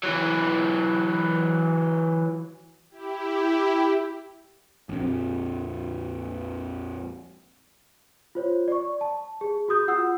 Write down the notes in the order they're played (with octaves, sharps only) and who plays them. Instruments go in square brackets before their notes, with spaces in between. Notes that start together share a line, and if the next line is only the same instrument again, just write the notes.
[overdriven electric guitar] E3 F#3
[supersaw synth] E4 G4
[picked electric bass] A#1 F2
[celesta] F4 C5 C#5
D5 C#6
A5
G#4
F#4 G#4 D#6 G6
F4 F#5 E6